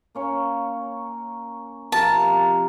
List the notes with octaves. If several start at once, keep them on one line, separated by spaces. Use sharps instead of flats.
A#3 C#4 C#5
C3 F3 A#4 A5